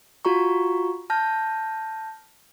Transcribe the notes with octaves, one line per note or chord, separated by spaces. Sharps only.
F4 F#4 A#5 C#6
A5 F6 G6 A#6